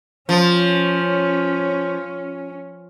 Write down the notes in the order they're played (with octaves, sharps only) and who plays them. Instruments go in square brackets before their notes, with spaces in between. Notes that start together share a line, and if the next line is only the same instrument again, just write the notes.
[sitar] F3 [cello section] C#4